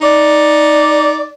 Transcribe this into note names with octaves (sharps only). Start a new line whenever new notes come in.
D#4 D5